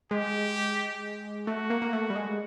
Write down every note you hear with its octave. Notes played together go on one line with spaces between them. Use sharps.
G#3 G4
A3 F#4
A#3
A#3
A3
G3
G#3